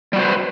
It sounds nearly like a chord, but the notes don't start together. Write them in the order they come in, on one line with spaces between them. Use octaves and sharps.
G3 F#4 C5 B4